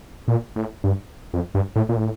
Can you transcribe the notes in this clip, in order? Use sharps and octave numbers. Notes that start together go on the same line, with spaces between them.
A#2
A2
G2
F2
G2
A2
A#2
A2